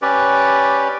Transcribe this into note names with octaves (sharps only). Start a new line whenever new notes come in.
C#4 G4 B4 D5